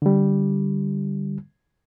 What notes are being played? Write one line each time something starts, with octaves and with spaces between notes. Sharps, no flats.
D3 G3